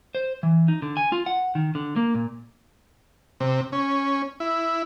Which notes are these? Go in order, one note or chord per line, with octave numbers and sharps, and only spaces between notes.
C5
E3
D#4
D3
G#5
F4
F#5
D#3
D3
A#3
A#2
C3
C#4
E4